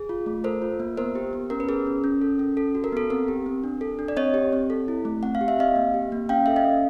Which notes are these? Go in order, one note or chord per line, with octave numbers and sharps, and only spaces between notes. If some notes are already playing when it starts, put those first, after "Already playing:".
Already playing: G#4
F4
A3
A4 A#4 C5
F4
A#3
B3 A#4 C5
G4
B3
C#4 A#4
B4
G#4 A#4
C#4
C#4
A4
C#4
A4
F#4
A#4
B3 A4
C4 A#4
G4
C4
D4
A4
D4
D5
C4 C#5 D#5
G4
C4
A4
E4
A3
C4 F#5
F5
G4
E5
C4 D#5 F5
A#3
G4
A#3
C#4 F5 G5
A4 E5
D#5 F5
C#4